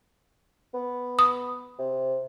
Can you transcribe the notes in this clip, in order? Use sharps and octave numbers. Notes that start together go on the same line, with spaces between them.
B3
D#6
C3